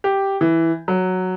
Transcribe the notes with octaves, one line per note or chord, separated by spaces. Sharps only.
G4
E3
F#3